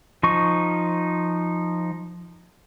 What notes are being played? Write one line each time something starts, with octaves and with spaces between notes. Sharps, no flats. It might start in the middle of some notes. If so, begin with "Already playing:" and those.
F3 D#4 C#6